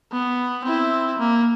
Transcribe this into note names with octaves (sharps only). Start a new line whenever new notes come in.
B3
C4 E4
A#3